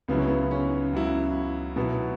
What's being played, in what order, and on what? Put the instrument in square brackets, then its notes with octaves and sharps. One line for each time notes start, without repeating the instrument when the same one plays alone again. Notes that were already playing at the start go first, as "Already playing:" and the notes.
[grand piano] C#2 C#3 F#3 E4 [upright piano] B3
[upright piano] C#4
B3
C#4
[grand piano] C#2 C#3 F#3 E4
[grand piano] B2 F#3 E4 [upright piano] B3